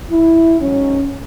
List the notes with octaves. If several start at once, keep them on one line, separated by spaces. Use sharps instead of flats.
E4
G#2 F#3 C#4